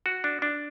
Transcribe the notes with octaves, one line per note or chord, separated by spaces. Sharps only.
F#4
D4
D4